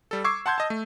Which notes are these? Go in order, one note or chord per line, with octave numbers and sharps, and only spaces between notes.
G3 A4
C#6 D6 E6 G#6 C7
F#5 A5 C6 G6 G#6
D#5 A5
A3